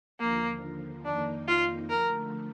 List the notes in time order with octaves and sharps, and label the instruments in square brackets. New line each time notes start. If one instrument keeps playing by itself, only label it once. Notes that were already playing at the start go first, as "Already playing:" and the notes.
[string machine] D#2 D3 F3 [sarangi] A#3
[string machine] F2 D#3 A#3 D#4 [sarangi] D4
[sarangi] F4
[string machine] D3 F3 A3 [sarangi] A#4